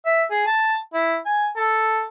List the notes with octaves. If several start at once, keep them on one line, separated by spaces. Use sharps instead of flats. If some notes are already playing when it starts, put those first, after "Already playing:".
E5
G#4
A5
E4
G#5
A4